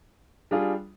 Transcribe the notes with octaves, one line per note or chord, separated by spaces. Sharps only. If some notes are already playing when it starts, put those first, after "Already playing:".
G3 D4 F4 G#4